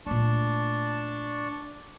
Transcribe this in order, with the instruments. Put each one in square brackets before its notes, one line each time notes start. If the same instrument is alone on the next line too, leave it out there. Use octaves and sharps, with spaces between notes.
[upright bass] A#2 A3 [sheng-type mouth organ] D4 A5 C#6